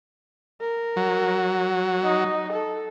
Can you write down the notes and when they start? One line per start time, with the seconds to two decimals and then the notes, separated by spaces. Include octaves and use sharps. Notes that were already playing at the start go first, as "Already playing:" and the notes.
0.61 A#4
0.96 F#3
2.04 D#4
2.53 A4